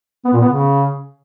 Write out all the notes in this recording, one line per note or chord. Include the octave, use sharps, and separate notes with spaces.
B3
A#2
B3
C#3